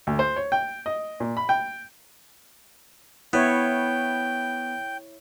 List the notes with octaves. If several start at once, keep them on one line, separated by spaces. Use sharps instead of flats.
D2
C5
C#5
G5
D#5
A#2
B5
G5
B3 E4 C#5 G5